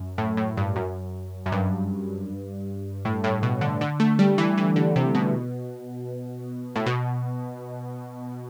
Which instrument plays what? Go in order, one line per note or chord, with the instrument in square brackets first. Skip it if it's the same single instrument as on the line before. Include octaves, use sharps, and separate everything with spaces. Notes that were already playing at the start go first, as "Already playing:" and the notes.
Already playing: [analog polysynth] F#2
A2
A2
G2
F#2
F#2
G2
A2
A2
B2
D3
D3
A3
G3
E3
E3
D3
C3
B2
A2
B2